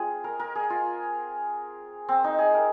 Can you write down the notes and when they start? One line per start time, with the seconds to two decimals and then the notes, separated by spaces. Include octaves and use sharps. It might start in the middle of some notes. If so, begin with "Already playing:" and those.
Already playing: C4 F4 G#4
0.24 A#4
0.40 A#4
0.55 G#4
0.70 F4
2.09 C4
2.24 D#4
2.38 G#4
2.54 A#4